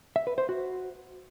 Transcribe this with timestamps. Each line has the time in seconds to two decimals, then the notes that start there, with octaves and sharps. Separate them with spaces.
0.16 E5
0.27 B4
0.38 C5
0.49 F#4